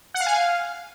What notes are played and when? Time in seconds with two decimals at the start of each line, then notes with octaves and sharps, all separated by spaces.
0.14 F#5
0.20 F5
0.26 G#5
0.32 F5